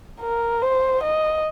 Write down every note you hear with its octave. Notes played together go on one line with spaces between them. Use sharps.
A#4
C5
D#5